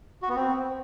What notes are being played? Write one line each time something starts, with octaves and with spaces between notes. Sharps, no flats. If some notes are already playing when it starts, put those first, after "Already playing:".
F#4
B3
C4